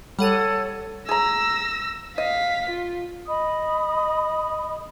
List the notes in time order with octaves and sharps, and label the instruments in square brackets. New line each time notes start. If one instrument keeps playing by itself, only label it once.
[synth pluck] G3 F#5 D#7 [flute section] A4 C#5
[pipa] G#4 A#5 [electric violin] E6 A#6
[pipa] D#5 [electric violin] F5 B6
[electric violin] F4
[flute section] D#5 B5 D#6